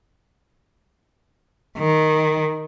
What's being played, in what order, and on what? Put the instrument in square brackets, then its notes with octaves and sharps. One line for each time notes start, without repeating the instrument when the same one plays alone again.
[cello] D#3